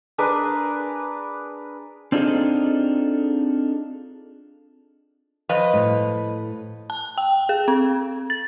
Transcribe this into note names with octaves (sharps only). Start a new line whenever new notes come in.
D4 G#4 A#4 B4
C4 D4 D#4 F4 G#4 A4
F3 B4 D#5
A2
A5
G5
G#4
C4
A6